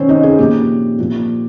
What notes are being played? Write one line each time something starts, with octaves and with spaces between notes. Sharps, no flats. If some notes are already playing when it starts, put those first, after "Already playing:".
Already playing: C3 D#3 C4 C#4 C5 C#5
D#4 D#5
G#4
A#2 F3 G4
A#2 F3